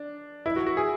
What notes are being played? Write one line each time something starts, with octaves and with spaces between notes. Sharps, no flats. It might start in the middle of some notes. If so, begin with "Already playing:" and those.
Already playing: D4
E4
F#4
F#4
G#4